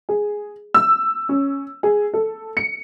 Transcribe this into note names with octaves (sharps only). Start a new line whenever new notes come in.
G#4
E6
C#4
G#4
A4
C#7